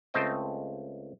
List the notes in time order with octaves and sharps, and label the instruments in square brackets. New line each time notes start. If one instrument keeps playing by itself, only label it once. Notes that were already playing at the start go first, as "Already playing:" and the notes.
[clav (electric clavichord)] C#2 A3 C4 C5 D#5 G5